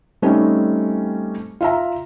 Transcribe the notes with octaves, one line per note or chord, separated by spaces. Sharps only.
G3 A3 C4 C#4 D#4
F4 E5 A#5